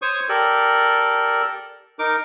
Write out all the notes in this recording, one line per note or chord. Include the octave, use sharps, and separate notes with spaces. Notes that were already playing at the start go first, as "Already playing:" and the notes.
C5 C#5 C#6 D#6
G4 A4 A#4 D5
D#4 A#4 D6